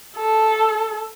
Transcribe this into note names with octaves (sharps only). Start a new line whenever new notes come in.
A4